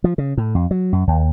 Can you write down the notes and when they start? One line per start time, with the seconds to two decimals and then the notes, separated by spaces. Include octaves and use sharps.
0.04 F3
0.18 C#3
0.37 A2
0.55 F2
0.71 F#3
0.93 F#2
1.07 D#2